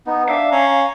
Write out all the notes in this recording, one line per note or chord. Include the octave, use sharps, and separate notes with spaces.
B3 D#4
D4 E5 F5
C#4 A#5